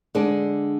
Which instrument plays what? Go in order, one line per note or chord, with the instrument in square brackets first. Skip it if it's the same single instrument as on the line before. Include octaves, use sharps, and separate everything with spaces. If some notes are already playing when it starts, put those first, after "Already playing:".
[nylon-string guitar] D3 G#3 D4